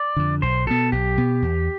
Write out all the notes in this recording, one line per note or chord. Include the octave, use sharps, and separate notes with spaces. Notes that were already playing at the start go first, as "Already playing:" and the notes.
Already playing: D5
F2 D3
B1 C5
B2 B3 A4
B1 G4
B2 B3
E2